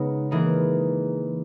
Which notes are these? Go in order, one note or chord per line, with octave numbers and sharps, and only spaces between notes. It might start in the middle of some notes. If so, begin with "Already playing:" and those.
Already playing: C#3 G#3 B3 D#4
E3 A#3 D#4 G#4